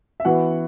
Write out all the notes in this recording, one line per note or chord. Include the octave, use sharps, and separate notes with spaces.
E5
E3 B3 F#4 F#5